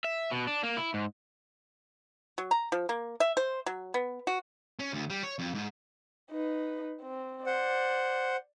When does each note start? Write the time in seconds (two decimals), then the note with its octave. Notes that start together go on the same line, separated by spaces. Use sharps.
0.04 E5
0.32 B2
0.47 D4
0.63 A#3
0.77 E4
0.94 G#2
2.38 F#3
2.51 A#5
2.72 F3
2.89 A#3
3.20 E5
3.37 C5
3.66 F#3
3.94 B3
4.27 F#4
4.79 C#4
4.93 D2
5.10 G3
5.23 C#5
5.39 F2
5.55 G#2
6.31 D#4 B4
7.02 C4
7.46 C5 D5 F#5